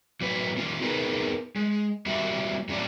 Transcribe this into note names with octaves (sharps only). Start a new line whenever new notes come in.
A2 F#3 A#3 B4
A#3 C#4 F4
B3 D#4 G#4 A#4 B4
G#3
G3 A#3 F#4 G4 E5 F#5
A2 F#3 C#4 F#4 D5 A5